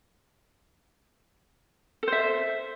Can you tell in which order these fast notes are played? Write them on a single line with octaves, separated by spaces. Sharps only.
A4 C5 E5